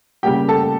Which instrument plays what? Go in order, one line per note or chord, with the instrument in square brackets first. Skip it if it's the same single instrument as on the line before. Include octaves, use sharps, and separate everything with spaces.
[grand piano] C#3 G3 A#3 G4 G5
A4 A5